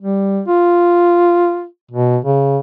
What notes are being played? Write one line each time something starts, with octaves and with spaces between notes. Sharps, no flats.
G3
F4
B2
C#3